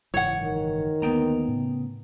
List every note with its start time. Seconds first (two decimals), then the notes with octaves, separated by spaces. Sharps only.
0.14 F#1 G#2 E3 C#5 F#5
0.43 D#3
1.02 D2 A#3 B3 G5 A#5
1.48 A2 C#3